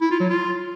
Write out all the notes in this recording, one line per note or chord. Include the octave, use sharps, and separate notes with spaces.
E4
F4
F#3
F4